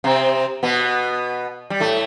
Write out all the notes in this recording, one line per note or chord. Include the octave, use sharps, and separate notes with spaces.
C3 C4
B2 B3
G3
A2 A3